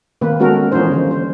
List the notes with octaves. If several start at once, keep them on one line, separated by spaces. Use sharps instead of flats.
D#3 A#3 C4 B4
G#3 B3 C#4 F#4 A4 A#4
E3 F3 B3 C#4 D#4 C5
D3 A#3 D#4
G3 C5